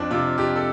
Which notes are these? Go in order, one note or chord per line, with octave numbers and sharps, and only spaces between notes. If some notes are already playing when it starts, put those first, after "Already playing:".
Already playing: F2 D4
C3 F4
F2 G4
A4